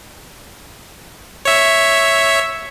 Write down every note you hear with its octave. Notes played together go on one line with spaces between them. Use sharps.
C#5 E5